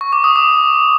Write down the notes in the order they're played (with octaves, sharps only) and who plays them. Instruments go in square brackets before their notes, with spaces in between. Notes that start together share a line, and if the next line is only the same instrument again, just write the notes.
[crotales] C#6
D6
D#6
D6